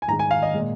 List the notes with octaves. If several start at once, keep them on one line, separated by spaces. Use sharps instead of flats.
G#5
G#2 D#3 G#3 A#5
G#5
F5
D#5
A#2 G#3